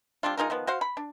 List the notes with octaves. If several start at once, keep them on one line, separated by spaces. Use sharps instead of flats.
G3 C4 D4 F4
G#3 D#4 F4 A#4
D#3 F3 B3
F#4 C5 F5
B5
D4